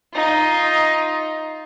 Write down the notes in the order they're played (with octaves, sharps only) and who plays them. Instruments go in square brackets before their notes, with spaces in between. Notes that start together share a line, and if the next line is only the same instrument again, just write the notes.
[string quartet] D#4 F4